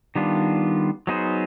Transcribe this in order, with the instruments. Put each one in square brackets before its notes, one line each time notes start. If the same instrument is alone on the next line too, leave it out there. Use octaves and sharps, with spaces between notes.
[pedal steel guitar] D#3 G3 B3 D4 F4
F#3 B3 D#4 G#4 C5